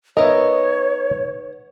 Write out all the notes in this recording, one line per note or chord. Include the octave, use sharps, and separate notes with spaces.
B3 D#4 A#4 C#5 D#5 E5